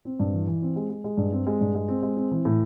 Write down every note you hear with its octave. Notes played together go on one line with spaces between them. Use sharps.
C4
G2
E3
E3
C4
G#3
G#3
G#3
G2
C4
G#3
G2
G#3
C4
G#3
C4
E3
A2